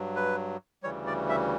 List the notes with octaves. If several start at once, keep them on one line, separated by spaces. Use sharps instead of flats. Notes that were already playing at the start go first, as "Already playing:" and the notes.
Already playing: G2 F#3
B4
D2 C#3 E3 G3 C#5
D5
E5